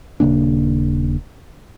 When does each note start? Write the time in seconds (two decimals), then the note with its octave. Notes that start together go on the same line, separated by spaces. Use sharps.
0.20 D#1 C#3 A#3 D4